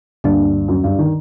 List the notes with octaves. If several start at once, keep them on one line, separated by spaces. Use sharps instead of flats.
D2 G2 D3 G3 A#3 D4
F#2
G2
D#3